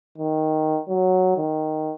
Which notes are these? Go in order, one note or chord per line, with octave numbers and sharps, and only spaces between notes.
D#3
F#3
D#3